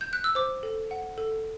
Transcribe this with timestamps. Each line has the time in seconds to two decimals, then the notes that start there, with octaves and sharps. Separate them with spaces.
0.01 G6
0.13 F#6
0.24 E6
0.35 C5 D6
0.63 A4
0.91 F#5
1.18 A4